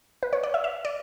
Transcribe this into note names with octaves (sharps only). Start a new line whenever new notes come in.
B4
C#5
D5
E5
E5
D5